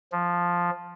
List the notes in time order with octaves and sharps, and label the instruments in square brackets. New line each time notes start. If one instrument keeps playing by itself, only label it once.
[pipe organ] F3